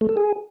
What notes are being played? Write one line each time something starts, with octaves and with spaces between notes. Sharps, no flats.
A3
A4
G#4